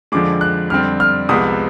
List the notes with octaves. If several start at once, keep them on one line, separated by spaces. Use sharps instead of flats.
F2 D3 F3 G#3 D6
F#6
F2 D3 G3 C4 F6
F6
C2 C3 F3 G#3 B3 D#6